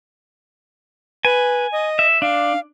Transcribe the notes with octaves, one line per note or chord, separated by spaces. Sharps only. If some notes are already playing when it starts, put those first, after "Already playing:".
B4 G#5
D#5
E5
D4 F5